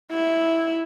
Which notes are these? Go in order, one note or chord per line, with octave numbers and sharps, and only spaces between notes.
E4